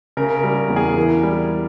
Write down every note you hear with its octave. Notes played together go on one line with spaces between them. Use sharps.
C#3 A#4
A#4
G3
A#4
E2
G#4
E3 A#4
G3